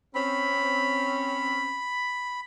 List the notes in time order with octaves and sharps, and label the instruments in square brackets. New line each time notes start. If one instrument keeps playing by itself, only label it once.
[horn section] C4 C#4 [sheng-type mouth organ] B5